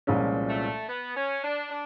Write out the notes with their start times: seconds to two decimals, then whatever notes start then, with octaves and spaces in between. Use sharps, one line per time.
0.07 C2 A#2 F3 G#3 C#4
0.49 A3
0.89 B3
1.16 C#4
1.44 D4
1.71 D4